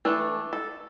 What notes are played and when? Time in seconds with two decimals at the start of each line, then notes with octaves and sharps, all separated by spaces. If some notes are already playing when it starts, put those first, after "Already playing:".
0.05 E3 A3 D4 A4
0.53 A4